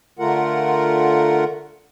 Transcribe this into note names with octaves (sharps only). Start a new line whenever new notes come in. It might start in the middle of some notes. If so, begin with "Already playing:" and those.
D3 A3 F4 A#4 F#5